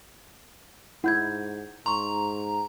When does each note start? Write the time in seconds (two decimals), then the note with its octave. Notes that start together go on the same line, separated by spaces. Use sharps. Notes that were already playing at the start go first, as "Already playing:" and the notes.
1.04 G#2 E4 F#5 G6 G#6
1.86 G#2 A#5 C6 C#6